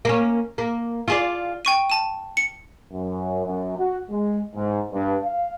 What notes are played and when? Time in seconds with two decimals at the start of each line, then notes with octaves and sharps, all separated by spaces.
0.05 A#3 C#4
0.58 A#3
1.08 F4 G#4 D5
1.65 G5 C#6 D#7
1.90 A5 D#7
2.37 C#7
2.92 F#2
3.46 F#2
3.77 F#4
4.09 G#3
4.54 G#2
4.92 G2
5.23 F5